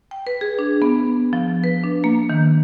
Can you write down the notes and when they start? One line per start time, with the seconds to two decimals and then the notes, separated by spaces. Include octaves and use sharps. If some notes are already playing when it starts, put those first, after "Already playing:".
0.11 G5
0.27 B4
0.41 G#4
0.59 D4
0.82 B3
1.33 F3
1.64 B4
1.84 D4
2.04 A#3
2.30 D#3